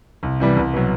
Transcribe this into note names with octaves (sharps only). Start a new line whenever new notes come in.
C2
C3 E3 G3 B3
C2
B2 F#3